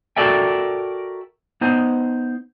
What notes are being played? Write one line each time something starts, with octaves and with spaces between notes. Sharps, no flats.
F#4 A4 A#4 D5 E5 G5
B3 D#4 C5